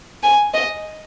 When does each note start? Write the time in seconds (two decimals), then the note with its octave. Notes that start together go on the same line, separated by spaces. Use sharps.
0.23 G#5
0.54 D#5